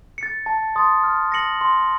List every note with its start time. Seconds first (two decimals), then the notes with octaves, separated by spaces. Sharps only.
0.18 A6 C#7
0.46 A5
0.76 C6 D#6 A6
1.03 F6
1.32 A#6 C#7 F#7
1.61 C6